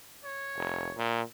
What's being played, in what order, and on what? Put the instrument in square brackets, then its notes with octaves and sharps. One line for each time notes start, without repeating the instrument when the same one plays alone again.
[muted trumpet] C#5
[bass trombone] F1
A#2